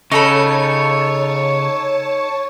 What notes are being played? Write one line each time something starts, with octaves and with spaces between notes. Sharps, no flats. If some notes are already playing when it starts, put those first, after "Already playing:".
C#3 D#4 A4 C#5 A5 B5 C#6 C#7